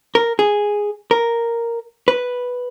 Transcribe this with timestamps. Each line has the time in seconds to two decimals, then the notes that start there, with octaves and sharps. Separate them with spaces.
0.15 A#4
0.39 G#4
1.11 A#4
2.08 B4